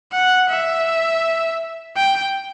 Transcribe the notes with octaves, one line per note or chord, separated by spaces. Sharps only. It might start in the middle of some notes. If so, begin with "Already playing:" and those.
F#5
E5
G5